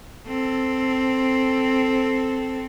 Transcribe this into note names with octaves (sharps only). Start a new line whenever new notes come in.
C4 A4